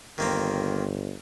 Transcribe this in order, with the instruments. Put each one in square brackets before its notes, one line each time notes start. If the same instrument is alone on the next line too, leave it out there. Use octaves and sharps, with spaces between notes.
[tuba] G1 [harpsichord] D#3 A#3 C4